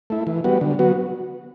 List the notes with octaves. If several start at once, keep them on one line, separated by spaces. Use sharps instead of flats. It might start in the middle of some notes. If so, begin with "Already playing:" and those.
A3 E4
E3
G3 B3 F#4
D3
F#3 B3 F#4